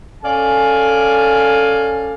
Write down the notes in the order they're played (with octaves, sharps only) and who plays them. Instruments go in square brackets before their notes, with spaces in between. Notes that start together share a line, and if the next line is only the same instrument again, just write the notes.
[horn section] C#4 A4 D5 F5 G#5